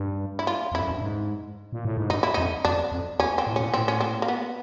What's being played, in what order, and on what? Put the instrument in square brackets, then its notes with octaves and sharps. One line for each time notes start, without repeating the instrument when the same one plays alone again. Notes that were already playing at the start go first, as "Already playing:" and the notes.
Already playing: [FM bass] G2
[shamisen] E4
F4
[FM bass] F2 [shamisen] E4
[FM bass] F#2
G2
G#2
A#2
A2
G#2
[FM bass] G2 [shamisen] D#4
[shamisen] E4
[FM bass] F2 [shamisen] D#4
[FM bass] F2 [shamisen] D4
[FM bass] F2
[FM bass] E2 [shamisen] C#4
[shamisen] C4
[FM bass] A2
[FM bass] A#2 [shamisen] C#4
[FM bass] A2 [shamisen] C4
[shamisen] C#4
C4
A#3
B3